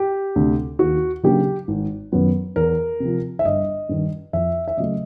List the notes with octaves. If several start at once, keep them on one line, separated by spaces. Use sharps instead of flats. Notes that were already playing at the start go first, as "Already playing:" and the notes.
Already playing: G4
D2 C3
D#2 F#4
C#3 F#3 A#3 D4 G4
G#1
F#2 D#3 F#3 B3
E2 A#4
C3
F3
E5
G1 D#5
G2 D#3
F2 E5
E5
C#3 F#3 A3 D#5